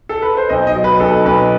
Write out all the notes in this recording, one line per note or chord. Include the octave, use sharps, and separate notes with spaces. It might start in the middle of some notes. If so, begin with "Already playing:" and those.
A4
B4
C5
B1 D#5
D#5
F#3
B4
B1 A4
B1 B4